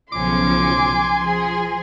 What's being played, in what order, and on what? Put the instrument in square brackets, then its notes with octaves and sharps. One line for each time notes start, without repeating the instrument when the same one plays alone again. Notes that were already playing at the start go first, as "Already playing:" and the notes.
[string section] B1 C#3 F3 [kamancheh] G#5 C6 [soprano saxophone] D6
[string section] F3 G#4